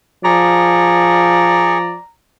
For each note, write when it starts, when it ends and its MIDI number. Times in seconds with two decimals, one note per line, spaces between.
0.25 1.95 53
0.25 1.78 68
0.25 2.01 74
0.25 2.10 82
0.25 1.78 85